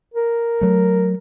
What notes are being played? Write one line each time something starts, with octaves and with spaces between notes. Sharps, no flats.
A#4
F#3 A3